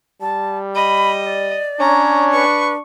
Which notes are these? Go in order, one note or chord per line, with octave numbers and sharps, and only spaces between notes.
G3 A5
D#5 B5
D5
C#4 D4 C#5 A#5
B4 C#6